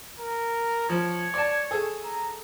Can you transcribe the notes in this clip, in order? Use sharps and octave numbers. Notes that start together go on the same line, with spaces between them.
A#4
F3 C#5
D5 A5
G#4 A4
A#5